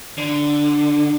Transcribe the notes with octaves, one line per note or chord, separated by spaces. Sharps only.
D3